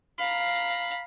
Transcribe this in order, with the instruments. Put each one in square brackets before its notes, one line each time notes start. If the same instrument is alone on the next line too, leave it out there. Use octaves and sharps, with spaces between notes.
[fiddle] F5 A#5 [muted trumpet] B5